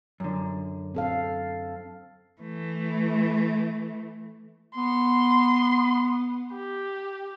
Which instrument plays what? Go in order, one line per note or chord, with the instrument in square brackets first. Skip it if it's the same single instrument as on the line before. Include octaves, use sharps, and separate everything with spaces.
[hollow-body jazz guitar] F#2 D3
[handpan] C4 A4 F5
[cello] E3 A3
[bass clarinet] B3 [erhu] C6
[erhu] G4